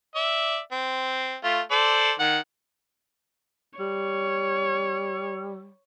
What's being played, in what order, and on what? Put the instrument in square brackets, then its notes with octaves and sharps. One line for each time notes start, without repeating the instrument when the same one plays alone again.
[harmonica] D5 E5
C4
A3 F4
A4 C5 D5
D#3 F#5
[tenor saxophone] G3 [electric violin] C#5